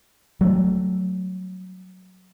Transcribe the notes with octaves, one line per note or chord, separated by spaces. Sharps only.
F#3 G3 A3